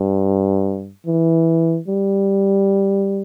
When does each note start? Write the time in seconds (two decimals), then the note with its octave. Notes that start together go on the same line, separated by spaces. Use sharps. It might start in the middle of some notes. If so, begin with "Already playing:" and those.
Already playing: G2
1.06 E3
1.88 G3